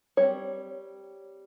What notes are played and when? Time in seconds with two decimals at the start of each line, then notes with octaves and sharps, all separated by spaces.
0.17 G3 C4 C#5